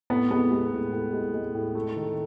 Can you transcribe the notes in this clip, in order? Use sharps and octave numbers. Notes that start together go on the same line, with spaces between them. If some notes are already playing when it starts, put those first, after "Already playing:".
A2 B3
G#3 B3
G#3
A2
A2
G#3
G#3
A2
A3
D#3